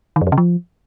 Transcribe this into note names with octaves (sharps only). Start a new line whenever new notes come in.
D#3
F#2
F2
C#3
F3